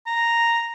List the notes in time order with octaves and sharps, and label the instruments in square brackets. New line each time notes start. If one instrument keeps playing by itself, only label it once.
[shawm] A#5